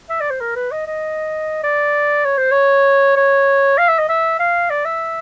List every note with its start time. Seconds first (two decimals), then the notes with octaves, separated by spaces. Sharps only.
0.10 E5
0.21 D5
0.30 C5
0.41 A#4
0.56 B4
0.71 D#5
0.87 D#5
1.63 D5
2.25 C#5
2.38 C5
2.52 C#5
3.17 C#5
3.78 F5
3.88 E5
3.99 D#5
4.09 E5
4.39 F5
4.70 D5
4.85 E5